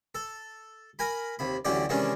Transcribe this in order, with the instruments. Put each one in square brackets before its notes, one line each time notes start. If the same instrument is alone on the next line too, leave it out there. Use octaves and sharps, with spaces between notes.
[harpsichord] A4
A#4 G#5 B5
D#2 C3 B5
A1 D2 F#3 C#4 G4 D5
C3 D#3 E3 G#3 C#4 D4